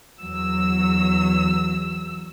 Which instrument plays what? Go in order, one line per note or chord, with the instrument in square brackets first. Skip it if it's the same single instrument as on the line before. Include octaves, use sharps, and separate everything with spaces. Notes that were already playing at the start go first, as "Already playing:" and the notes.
[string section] E2 F#3 E6